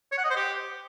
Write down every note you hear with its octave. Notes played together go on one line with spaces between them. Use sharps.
C#5
F#5
D#5
C5
G4